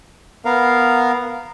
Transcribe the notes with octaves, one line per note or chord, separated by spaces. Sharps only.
B3 A#4 F5